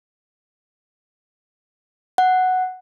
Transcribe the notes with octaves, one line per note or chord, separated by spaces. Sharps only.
F#5